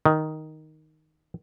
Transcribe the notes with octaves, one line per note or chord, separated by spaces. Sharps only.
D#3